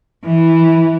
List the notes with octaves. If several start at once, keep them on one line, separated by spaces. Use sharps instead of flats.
E3